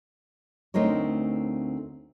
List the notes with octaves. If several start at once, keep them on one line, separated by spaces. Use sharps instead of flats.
D2 A3 C4 D#4 A#4 C#5